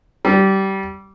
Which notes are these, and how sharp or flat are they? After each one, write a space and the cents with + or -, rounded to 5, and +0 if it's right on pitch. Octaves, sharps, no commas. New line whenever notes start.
G3 -20